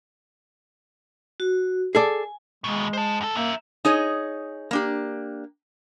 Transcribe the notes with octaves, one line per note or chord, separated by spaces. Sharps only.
F#4
G#4 A4 D5 G#5
D#2 B2 G#3
C5 A5
F#2 A4
A#3 A#4 E5
D#4 G#4 C#5 D#5
A#3 D4 G4